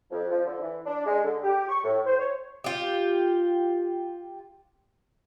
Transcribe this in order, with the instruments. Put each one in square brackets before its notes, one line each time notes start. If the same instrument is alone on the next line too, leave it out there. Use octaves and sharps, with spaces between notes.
[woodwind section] F2
F3
D3
E3
D4
G#3
D3
G4
C#6
A2
C5
C#5
[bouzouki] F4 G4